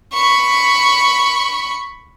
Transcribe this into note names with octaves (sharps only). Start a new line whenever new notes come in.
B5 C#6